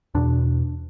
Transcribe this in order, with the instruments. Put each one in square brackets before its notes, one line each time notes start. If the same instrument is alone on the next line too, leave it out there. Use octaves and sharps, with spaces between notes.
[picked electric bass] E2 B2 D4